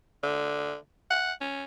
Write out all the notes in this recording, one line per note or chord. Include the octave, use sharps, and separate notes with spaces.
D3
F#5
C#4